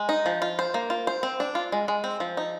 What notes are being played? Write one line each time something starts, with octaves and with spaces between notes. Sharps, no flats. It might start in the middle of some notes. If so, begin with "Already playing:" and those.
Already playing: G#3
D#4
F3
F4
C5
A#3
F4
C5
C4
D4
F4
G#3
G#3
C4
F3
D#4